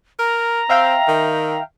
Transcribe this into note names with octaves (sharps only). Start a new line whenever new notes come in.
A#4 A#5
C4 E5 F5 G5
D#3